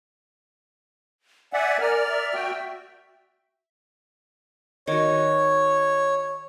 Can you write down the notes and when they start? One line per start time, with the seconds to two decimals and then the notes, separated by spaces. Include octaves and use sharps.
1.53 D5 E5 F#5 G#5
1.81 A#4 D5 F6
2.09 E5
2.34 F#4 G5
4.87 D#3 F#4 C#5